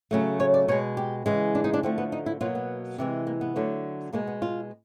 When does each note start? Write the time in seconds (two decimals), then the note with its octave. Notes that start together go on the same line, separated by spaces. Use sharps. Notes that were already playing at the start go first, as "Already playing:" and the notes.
0.11 C#3 F#3 A3
0.40 C#5
0.54 D5
0.68 B2 G#3 C#5
0.97 G4
1.26 C#3 E3 G#3
1.55 D4
1.64 D#4
1.74 D4
1.83 D3 F3 A3 C4
1.98 B3
2.12 D#4
2.26 E4
2.41 B2 F#3 A#3 F4
2.55 B3
2.98 C3 E3 G#3
3.27 A#3
3.41 B3
3.56 D3 F#3 A3
4.13 B2 G#3 A#3
4.27 B3
4.42 F4